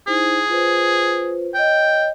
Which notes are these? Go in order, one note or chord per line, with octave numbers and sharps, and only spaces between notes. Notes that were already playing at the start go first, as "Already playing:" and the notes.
D#4 E4 G#4 C5
F4 B4 C5
C#5 D#5 G5